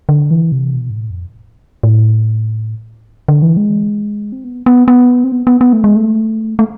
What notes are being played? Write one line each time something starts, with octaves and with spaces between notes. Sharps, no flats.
D3
E3
C3
B2
G#2
A2
F2
A2
D3
E3
G#3
C4
B3
B3
B3
C4
B3
B3
B3
A3
G#3
A3
A3